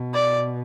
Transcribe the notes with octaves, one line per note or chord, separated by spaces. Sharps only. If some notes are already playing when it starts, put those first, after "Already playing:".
Already playing: B2
D5